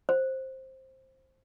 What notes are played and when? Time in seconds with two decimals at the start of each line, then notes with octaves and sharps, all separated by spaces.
0.09 C5